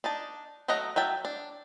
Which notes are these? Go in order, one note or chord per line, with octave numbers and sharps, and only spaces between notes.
D4 D#4 A5
F#3 A3 D#5 F#5 A#5
F#3 E5 G5 A5
D4